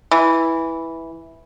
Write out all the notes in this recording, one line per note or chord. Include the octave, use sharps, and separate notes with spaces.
E3